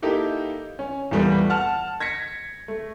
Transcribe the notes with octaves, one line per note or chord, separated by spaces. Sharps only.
A#3 D#4 E4 G4 A4
C#4
E2 A#2 G3 A3 B3
F#5 A5 F6
G#6 A#6 B6 C#7
A3